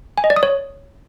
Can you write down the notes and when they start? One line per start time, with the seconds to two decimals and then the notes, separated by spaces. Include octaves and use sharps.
0.18 G#5
0.24 D#5
0.30 D5
0.36 D#6
0.43 C#5